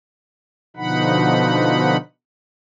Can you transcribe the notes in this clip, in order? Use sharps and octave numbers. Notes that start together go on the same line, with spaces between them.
B2 D3 F3 D#4 F#5 B5